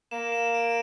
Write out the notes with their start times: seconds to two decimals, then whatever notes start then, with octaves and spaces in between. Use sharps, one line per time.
0.11 A#3 E7
0.32 E7
0.54 D7